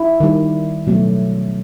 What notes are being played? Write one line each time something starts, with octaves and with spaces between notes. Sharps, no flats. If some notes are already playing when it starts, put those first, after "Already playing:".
Already playing: E4
D#3 G3
B2 F#3 A3